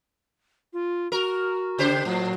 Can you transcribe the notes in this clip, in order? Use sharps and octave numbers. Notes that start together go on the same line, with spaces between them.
F4
F#4 A#4
C#3 G4 C5
A2 F#3